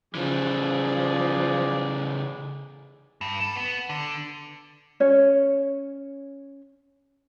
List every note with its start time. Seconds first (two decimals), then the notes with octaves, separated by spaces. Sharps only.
0.15 C#3 E3 F3 G#4 D5
3.21 G2
3.40 A4
3.55 B3
3.90 D3
5.00 C#4 C#5